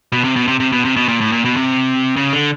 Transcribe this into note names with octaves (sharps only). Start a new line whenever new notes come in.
B2
C3
B2
C3
C3
B2
C3
B2
A#2
A2
A#2
B2
C3
C#3
D3